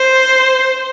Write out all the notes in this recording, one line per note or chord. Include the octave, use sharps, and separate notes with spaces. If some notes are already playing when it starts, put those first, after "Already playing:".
Already playing: C5